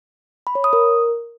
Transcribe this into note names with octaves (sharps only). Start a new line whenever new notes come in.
B5
C#5
D#6
A#4